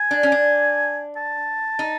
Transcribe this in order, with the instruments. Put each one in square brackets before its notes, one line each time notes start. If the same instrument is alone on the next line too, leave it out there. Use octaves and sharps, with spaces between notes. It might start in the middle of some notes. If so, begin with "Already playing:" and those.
Already playing: [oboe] G#5
[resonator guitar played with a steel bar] D4
C#4
D4
[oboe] A5
[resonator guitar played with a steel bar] D#4